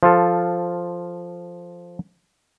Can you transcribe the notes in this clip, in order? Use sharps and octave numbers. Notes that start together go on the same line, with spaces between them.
F3 F4 A4